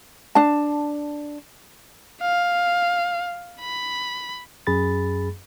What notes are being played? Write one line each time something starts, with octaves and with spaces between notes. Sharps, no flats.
D4 A5
F5
B5
F#2 G#4 B5 A6